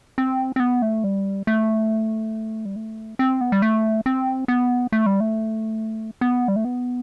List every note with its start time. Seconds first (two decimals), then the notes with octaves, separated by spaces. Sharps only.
0.18 C4
0.56 C4
0.60 B3
0.82 A3
1.04 G3
1.47 A3
2.65 G3
2.76 A3
3.19 C4
3.41 B3
3.52 G3
3.62 A3
4.06 C4
4.48 B3
4.92 A3
5.06 G3
5.20 A3
6.21 B3
6.48 G3
6.56 A3
6.65 B3